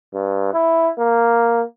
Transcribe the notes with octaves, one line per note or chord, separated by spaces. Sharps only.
G2
E4
A#3